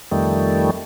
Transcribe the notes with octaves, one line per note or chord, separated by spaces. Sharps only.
F2 D#3 G3 A3